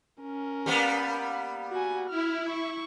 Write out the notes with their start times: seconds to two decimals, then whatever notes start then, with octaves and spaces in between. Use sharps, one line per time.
0.22 C#4 A#4
0.66 G3 A#3 B3
1.72 F#4 G#5
2.09 E4 F6
2.49 C#6